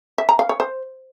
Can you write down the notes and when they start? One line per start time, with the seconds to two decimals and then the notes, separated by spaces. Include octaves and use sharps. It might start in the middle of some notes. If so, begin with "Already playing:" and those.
0.18 E5
0.29 A#5
0.39 F5
0.49 C#5
0.60 C5